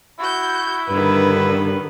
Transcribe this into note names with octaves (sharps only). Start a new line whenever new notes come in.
E4 F#4 G6
G2 D3 D#3 B4